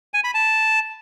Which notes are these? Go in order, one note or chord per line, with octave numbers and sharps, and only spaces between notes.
G#5
B5
A5